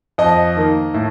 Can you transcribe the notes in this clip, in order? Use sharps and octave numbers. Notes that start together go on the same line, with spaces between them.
F2 D#5
D#3 A#3
A2